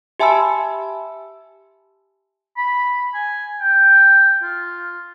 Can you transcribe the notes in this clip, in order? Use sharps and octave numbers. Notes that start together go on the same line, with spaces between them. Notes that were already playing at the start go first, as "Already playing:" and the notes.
G4 E5 G#5 A5 B5 E6
B5
G#5
G5
F4